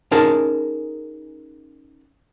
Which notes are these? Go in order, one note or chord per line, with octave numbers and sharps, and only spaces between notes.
C#4 D#4 G#4 A#4 A5